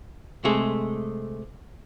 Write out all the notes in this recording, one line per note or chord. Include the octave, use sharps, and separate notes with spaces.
C3 G#3 A3 G#4